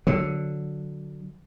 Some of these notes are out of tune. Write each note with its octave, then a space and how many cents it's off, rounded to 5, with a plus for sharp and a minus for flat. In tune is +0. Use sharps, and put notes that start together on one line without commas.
D3 +0 F#3 -10